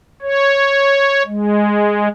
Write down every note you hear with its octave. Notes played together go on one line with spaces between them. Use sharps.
C#5
G#3